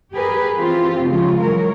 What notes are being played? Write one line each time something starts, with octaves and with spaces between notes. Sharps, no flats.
G4 G#4 A#4 B4
E3 C4 F4 G4
C#3 F3 G#3 F4
E3 F#3 G#3 A#4 C#5